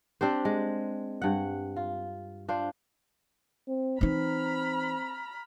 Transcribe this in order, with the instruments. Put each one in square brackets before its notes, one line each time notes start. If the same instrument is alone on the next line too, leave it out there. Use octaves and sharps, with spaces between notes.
[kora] C4 D4 G4 C5
G#3
G2 F#5
F4
D4 F4 C5
[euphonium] C4
[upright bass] E3 D#4 [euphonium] C4 [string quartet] A#5 B5 F6